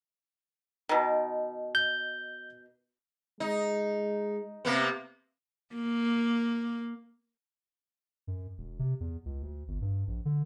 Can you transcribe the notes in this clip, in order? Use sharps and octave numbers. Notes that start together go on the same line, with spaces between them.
B2 D#3
G6
G#3 D#4
C3 A#3 B3
A#3
F#2
E1
C3
E2
C#2
D2
G1
G2
A#1
D3